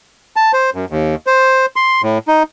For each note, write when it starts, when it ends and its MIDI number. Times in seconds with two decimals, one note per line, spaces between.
0.36 0.52 81
0.53 0.70 72
0.74 0.85 42
0.90 1.15 39
1.27 1.66 72
1.76 2.02 84
2.02 2.18 45
2.28 2.43 63